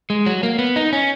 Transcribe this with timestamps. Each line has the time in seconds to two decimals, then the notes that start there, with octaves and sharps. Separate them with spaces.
0.10 G#3
0.26 F#3
0.43 A#3
0.59 B3
0.76 D#4
0.93 C#4